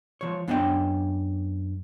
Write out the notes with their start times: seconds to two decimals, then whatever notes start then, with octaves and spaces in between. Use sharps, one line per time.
0.21 F3 C#5
0.48 F#2 B3 D4 C#5 D#5 G5